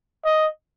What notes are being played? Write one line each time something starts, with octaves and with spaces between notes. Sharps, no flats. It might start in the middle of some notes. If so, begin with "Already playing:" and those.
D#5